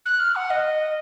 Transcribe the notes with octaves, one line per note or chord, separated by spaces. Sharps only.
F#6
F6
F#5
D#5